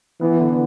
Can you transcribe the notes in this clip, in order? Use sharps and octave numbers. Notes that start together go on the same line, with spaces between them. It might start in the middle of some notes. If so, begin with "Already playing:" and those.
E3 B3
D3